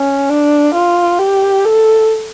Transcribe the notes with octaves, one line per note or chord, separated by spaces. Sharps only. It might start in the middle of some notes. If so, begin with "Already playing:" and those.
Already playing: C#4
D4
F4
G4
A4